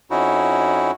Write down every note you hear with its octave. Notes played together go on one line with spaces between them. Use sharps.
F2 C#4 D#4 E4 F#4